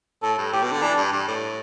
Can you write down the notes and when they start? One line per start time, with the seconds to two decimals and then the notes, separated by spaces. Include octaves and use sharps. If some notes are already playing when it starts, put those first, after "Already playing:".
0.23 A2 A4
0.38 G2
0.53 A2 G4
0.63 B2
0.72 D3
0.82 E3 D4
0.98 G2
1.13 G2
1.28 A2